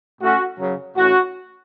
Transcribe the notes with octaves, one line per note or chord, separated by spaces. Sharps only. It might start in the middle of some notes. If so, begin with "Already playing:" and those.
A2 A3 C#4 F#4
F#2 C#3 F#3
A2 E3 C#4 F#4